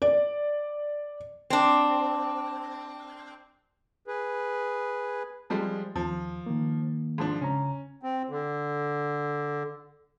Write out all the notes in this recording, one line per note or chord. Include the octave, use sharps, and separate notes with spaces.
D5
C4 D4
G#4 B4
F3 G3 G#3
D#2 F3
D#3 A#3
G#2 F3 D4
C#3 C#4 A#5
C4
D3